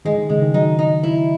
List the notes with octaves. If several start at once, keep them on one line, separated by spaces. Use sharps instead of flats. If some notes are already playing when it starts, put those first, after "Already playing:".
D#3 G#3
D#3
C#3 G#3
D#3
F#3 D#4
D#4
E4